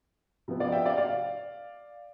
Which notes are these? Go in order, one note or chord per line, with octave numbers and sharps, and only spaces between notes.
C3 F3 B3
D5 F5
E5 G5
D5 F5
D5 F5